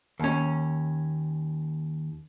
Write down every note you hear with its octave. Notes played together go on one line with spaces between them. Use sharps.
D#2 C#4